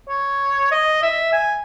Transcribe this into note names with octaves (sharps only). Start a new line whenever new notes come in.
C#5
D#5
E5
G#5